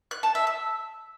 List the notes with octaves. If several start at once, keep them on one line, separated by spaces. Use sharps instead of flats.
F#6
A5
E5
E6